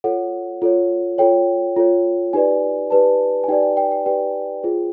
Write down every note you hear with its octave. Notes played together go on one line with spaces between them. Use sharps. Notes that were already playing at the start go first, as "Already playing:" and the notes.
F4 A4 C#5 F#5
F4 A4 C#5
F4 A4 C#5 G5
F4 A4 C#5
D#4 G4 B4 D5 G#5
D#4 G4 B4 D5 A5
G#5
D#4 G4 B4 D5 G5
G5
G5
G5
D#4 G4 B4 D5 G5
F4 G#4 C5